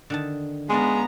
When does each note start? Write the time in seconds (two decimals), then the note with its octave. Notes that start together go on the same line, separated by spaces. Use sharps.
0.10 D3 D#3 A5
0.70 G#3 B3 C#4 D4 F4 A#5